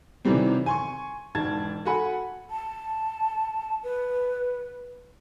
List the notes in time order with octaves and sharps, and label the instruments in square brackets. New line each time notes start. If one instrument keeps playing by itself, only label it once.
[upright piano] C3 D#3 E3 F#3 G3 C4
G#5 C6 C#6
E1 G#2 A5 G#6
F#4 A4 F#5 G#5 B5
[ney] A5
B4